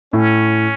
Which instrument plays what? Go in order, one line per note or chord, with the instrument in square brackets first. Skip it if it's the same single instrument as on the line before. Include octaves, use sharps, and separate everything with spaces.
[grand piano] A2 [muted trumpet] C#4